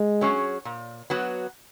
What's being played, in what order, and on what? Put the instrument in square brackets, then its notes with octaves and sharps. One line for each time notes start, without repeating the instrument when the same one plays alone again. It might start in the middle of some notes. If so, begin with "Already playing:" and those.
Already playing: [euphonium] G#3
[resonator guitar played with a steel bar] F#3 C#4 G#4
A#2
F#3 B3 F#4